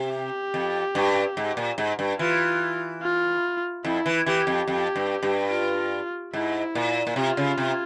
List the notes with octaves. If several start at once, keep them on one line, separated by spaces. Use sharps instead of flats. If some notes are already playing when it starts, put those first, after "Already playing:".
Already playing: C3
G4
F2
G2
G#2
A#2
G#2
G2
E3 F4
F4
F2 E4
E3
E3 G4
F2
F2 G4
G2
G2
F4
G#2 E4
A#2
A#2
C3 F4
C#3
C3